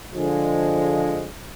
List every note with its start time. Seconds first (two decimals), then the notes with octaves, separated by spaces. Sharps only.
0.12 D3 F3 G#3